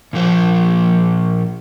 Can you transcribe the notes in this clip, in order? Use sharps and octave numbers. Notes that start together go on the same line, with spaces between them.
A#2 F3 C5